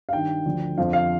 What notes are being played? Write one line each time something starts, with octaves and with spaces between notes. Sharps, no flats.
F5
G2 D#3 G5
D2 D3 F3
F2 D3 F3 F5
F5